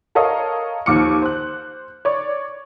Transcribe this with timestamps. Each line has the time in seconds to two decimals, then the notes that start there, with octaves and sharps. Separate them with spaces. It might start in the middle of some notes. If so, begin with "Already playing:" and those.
0.15 A4 A#4 C#5 D#5 F5
0.86 D#2 F3 D6 F6 C#7
1.22 C5 F#6
2.05 C#5 D5